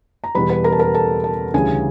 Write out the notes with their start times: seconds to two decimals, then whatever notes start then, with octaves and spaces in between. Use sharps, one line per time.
0.24 A#5
0.35 E2 B2 G3 B4 B5
0.50 B4 B5
0.64 A#4 A#5
0.72 A5
0.79 A#4 A#5
0.94 A4 A5
1.24 A4 A5
1.54 D2 C#3 E3 G3 G#4 G#5